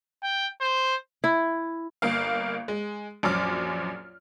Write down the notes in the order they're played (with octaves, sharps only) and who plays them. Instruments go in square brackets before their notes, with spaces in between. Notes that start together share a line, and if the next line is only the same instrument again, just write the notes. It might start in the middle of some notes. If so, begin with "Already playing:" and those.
[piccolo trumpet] G5
C5
[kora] E4
[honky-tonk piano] G1 A#3 F5
G#3
A#1 F#2 C#4 D6 F6